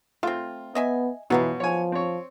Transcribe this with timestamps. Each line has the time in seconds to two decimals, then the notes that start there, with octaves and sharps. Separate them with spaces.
0.23 A3 C4 F4
0.75 B3 D#5 E5 G#5
1.30 B2 E3 F#3 B3 F4
1.60 F3 C#5 G#5
1.92 C4 C#5